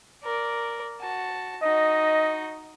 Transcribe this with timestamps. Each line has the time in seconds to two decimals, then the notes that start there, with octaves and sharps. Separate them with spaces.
0.23 A#4 D5
1.00 F#4 A5
1.62 D#4 F#4 D#5